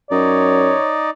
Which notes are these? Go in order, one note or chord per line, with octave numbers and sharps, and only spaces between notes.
F#2 D#4 C#5 D5